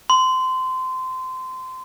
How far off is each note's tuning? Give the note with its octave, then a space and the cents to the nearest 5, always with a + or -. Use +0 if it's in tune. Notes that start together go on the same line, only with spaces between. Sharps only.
C6 -25